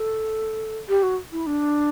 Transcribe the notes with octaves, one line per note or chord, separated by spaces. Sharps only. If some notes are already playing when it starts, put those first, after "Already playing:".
Already playing: A4
G4
F#4
E4
D4